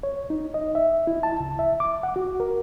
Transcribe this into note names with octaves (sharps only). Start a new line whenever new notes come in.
C#5
D#4
D#5
E5
E4
A5
C#2
E5
D6
F#5
F#4
A#4